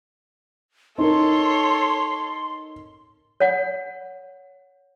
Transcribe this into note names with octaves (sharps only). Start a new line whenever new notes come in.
D#4 A4 A#4 C#5 C6
C#5 F#5